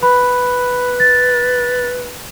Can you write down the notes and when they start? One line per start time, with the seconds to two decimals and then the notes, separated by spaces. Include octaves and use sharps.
0.03 B4 B5
1.00 A6